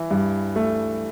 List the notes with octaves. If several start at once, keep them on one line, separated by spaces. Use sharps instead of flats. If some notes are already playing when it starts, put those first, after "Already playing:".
Already playing: E3
G2
A3